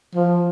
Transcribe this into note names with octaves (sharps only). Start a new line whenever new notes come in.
F3